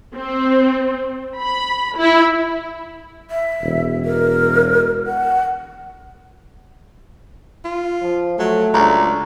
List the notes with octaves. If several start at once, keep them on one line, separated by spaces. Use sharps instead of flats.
C4
B5
E4
E5
E1
A#4
F#5
F4
F3
F#3 A3
C#2 D4 D5 A#5